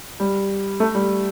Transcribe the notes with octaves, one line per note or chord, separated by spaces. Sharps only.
G3
A3
G3